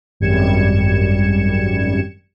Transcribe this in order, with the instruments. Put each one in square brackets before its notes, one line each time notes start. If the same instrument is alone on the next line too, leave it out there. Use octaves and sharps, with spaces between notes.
[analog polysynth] G#1 F#2 G3 G#6 C#7 E7